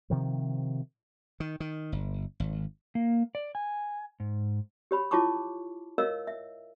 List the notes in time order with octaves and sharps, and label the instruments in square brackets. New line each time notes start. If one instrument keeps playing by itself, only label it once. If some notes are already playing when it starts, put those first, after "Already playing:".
[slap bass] C3 D#3 F3
D#3
D#3
G1
G#1
[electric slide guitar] A#3
D5
G#5
G#2
[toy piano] G4 C#5 B5
E4 F4 C#5 A5 C#6 D6
A#4 C#5 D#5 F5 E6
E5